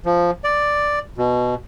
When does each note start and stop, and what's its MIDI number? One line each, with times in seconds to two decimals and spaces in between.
0.06 0.31 53
0.44 0.99 74
1.18 1.55 47